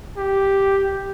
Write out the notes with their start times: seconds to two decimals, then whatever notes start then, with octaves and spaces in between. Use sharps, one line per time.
0.17 G4